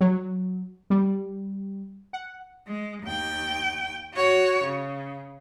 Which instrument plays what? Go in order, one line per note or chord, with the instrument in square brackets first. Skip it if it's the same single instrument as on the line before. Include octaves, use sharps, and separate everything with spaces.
[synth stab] F#3
G3
F#5
[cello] G#3
D#2 G5
F#4 C#5
C#3